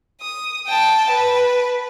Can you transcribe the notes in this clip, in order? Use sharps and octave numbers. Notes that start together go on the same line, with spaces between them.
D#6
G5 A5
B4